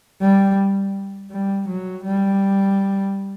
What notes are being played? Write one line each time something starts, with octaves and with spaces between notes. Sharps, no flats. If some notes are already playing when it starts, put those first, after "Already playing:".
G3
G3
F#3
G3